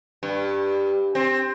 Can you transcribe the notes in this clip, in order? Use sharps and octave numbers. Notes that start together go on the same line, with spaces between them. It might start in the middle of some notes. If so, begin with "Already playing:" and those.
G2
C4